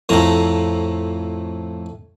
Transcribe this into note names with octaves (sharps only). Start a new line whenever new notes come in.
F2 A2 A3 A#5